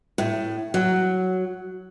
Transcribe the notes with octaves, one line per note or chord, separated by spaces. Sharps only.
A2
F#3